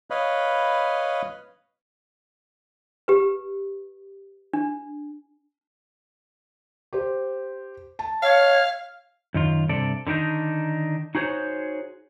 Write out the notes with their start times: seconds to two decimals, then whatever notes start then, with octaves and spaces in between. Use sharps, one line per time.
0.10 B4 C#5 D#5 F5 B5
3.08 G4 B4
4.53 D4
6.93 G4 C5
7.99 A5
8.23 C#5 F5
9.34 F#2 D#3 F4
9.69 G2 C3 A4 D5
10.07 D3 D#3 D4 D#4
11.15 D#4 F#4 G#4 C5 C#5